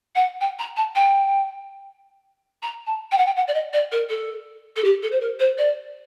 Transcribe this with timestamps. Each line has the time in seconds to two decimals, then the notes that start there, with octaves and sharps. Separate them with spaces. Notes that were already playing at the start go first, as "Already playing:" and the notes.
0.15 F#5
0.41 G5
0.59 A#5
0.77 A5
0.95 G5
2.63 A#5
2.87 A5
3.12 G5
3.18 F#5
3.26 G5
3.36 F#5
3.48 D5
3.54 D#5
3.73 D5
3.92 A#4
4.09 A4
4.76 A4
4.84 G4
5.03 A4
5.12 C5
5.20 A#4
5.39 C5
5.58 D5